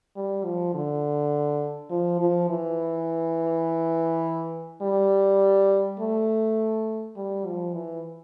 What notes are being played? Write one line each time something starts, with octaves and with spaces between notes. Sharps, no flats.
G3
F3
D3
F3
F3
E3
G3
A3
G3
F3
E3